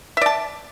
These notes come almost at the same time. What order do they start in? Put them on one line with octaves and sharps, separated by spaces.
E5 D5 A5